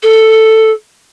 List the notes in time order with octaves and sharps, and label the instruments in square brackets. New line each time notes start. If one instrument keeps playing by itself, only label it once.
[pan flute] A4